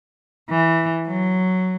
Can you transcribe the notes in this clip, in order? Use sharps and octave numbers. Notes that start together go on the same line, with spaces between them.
E3
F#3